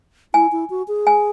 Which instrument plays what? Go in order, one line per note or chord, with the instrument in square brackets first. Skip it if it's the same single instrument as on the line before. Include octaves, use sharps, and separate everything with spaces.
[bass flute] E4 [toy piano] G#5
[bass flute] E4
F#4
G#4
[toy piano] G#5